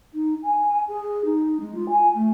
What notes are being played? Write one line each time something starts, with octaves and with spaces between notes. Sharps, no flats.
D#4
G#5
G#4
D#4
G#3
F4
G#5
A3